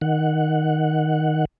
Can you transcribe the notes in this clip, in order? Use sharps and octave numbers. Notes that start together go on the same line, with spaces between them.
D#3 F#5